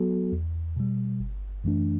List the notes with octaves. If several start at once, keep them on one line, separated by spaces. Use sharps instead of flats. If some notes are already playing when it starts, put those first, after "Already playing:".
Already playing: F#3 B3 F#4 A4
E2
B2 G3
G1
F#2 E3 A3 D4